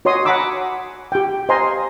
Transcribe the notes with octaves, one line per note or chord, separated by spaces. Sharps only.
F#4 C#5 D#5 C6 D#6
F#5 G#5 A#5 B5 D6 E6
G4 G5
C5 D#5 F5 G#5 A#5 C6